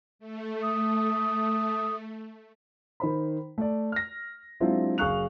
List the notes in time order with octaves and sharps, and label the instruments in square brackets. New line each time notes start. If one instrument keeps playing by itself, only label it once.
[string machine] A3
[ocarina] D#6
[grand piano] D#3 C5 B5
A3 D5
F6 A#6
F#3 G#3 C4 D4 E4 F4
F#1 G#4 F5 C#6 F#6 F7